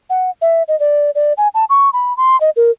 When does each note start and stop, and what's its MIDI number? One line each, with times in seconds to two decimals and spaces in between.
0.10 0.30 78
0.42 0.63 76
0.68 0.78 75
0.80 1.11 74
1.15 1.33 74
1.38 1.48 80
1.54 1.65 81
1.70 1.90 85
1.93 2.16 83
2.17 2.39 84
2.41 2.50 75
2.56 2.71 70